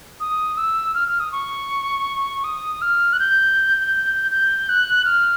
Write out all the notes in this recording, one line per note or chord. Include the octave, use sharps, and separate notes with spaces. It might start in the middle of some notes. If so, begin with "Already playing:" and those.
D#6
E6
F6
F6
D#6
C#6
D#6
F6
F#6
G6
G6
F#6
F6